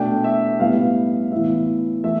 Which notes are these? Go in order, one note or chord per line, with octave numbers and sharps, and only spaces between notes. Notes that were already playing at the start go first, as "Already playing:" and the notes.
Already playing: B2 A3 D4 G5
E5
A2 G3 B3 F5
A2 E3 B3 E5
E3 A3 E5